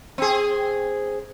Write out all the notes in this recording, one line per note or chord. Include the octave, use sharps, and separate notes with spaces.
C4 G#4